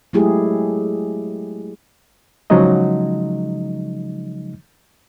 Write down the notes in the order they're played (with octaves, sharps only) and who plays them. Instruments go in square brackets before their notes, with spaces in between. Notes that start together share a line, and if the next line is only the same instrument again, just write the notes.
[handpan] F#3 G#3 A3 E4 G4 G#4
[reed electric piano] C#3 F3 F#3 G#3 D#4 D#5